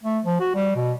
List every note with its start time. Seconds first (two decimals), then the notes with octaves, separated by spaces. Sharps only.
0.03 A3
0.25 F3
0.40 F#4
0.55 G3
0.76 B2